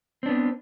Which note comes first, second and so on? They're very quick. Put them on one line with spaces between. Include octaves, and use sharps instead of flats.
C4 D4 B3